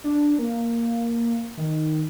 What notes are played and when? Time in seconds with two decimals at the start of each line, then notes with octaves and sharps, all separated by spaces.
0.04 D4
0.38 A#3
1.57 D#3